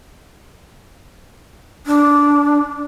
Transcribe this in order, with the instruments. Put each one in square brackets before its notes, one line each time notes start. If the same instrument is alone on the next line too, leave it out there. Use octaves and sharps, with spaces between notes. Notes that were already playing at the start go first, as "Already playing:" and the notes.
[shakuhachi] D4